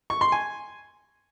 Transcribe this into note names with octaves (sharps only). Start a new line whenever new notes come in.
C#6
C6
G#5